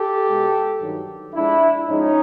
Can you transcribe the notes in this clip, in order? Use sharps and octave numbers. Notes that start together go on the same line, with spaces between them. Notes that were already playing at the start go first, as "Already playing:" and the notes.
Already playing: G4 A4
B2 G#3
G2 D#3 F#3
G#2 F3 G#3 D4 E4
G#2 F3 G#3 C#4 D#4